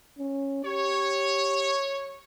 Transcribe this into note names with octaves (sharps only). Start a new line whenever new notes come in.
C#4
G4 C#5